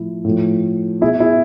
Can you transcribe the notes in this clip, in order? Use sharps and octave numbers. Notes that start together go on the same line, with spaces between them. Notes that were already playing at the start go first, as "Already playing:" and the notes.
Already playing: A2 F3 E4
A2 F3
B2 E4 G#4
E4 G#4